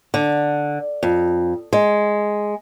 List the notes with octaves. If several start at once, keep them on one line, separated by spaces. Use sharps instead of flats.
D3
F2
G#3